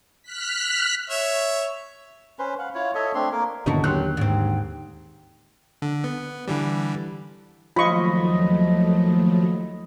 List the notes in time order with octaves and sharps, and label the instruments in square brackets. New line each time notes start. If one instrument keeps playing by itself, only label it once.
[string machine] F6 F#6 B6
[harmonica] C#5 E5
[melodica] C#4 B4 C5
F5 F#5
E4 F4 C#5
A4 C#5 D#5 E5
A3 C4 D4 C6
A#3 A#4
[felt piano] G1 A5 [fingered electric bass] D#2 D3 [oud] D#4 E4 F#4
[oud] F#3 [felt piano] G4 C6 F#6
[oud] G#2 C4
[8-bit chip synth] D3
B3
D3 E3 G3
[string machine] D#2 F#3 A3 [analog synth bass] F3 [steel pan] F4 C#6 [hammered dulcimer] D#5 B5